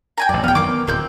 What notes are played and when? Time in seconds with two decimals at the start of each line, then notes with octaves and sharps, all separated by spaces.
0.18 G5 G#5 A#5
0.29 A1 F#2 D5
0.44 D#1 E3 B3 F5 G5
0.55 F#2 D#3 E3 A#3 D6
0.69 B3
0.87 D1 A#3 C4 G6